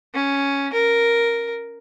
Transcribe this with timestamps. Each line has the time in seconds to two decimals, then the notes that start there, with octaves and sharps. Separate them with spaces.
0.14 C#4
0.73 A#4